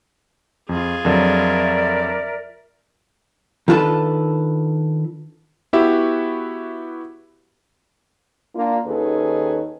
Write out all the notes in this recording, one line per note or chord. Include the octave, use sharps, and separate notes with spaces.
F2 F4 G#4
F2 D3 F#3 A#4 D5 E5
D#3 D4 F4 A4 B4
B3 E4 F#4 G4 E5
A#3 D4 F4
D#2 D#3 C#4 G#4 A4 B4